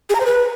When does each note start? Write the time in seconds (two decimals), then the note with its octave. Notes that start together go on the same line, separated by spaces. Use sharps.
0.10 G#4
0.15 A#5
0.20 C5
0.25 B4